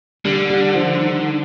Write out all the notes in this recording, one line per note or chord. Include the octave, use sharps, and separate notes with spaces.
D3 G3
G3
F3
D#3